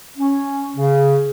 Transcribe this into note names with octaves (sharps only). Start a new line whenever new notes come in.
C#4
C#3